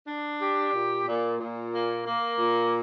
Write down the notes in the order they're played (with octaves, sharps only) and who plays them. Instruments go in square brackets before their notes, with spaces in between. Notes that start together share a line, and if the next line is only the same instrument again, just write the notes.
[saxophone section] D4
G4
A#2
A#2
A#2
A#3
A#3
A#2